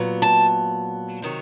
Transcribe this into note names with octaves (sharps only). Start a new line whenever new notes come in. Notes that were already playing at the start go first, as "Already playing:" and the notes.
Already playing: A#2 F#3 B3
A5
C3 D#3 F#3